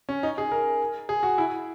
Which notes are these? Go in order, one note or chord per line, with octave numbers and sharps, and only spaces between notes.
C#4
D#4
G#4
A#4
G#4
F#4
E4